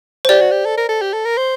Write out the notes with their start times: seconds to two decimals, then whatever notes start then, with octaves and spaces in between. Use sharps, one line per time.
0.25 C5
0.29 G4 D5
0.40 F#4
0.51 G4
0.66 A4
0.77 A#4
0.89 A4
1.01 G4
1.14 A4
1.25 A#4
1.37 C5